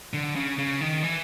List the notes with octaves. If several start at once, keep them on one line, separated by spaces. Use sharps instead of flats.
D3
C#3
C#3
D#3
E3